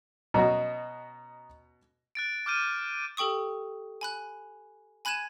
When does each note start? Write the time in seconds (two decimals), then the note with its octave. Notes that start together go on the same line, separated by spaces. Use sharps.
0.34 B2 C#4 F#4 D#5 A#5
2.15 F#6 A6 D7
2.46 D6 F6 G6 D#7
3.17 G4 A4 G5 C#6 D#6
4.01 G#5 B5 F#6
5.05 G#5 B5 F#6 G#6 D#7 E7